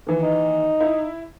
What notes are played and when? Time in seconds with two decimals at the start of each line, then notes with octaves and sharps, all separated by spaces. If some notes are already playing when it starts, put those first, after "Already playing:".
0.07 D#2 E3
0.22 D#4
0.80 E4